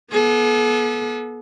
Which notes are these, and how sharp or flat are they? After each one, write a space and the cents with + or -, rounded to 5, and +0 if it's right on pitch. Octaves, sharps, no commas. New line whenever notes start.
B3 -30 A4 -45